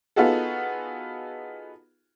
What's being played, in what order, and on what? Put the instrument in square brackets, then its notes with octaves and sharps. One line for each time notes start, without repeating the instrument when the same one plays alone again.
[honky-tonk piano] B3 D#4 F4 F#4 G#4 A4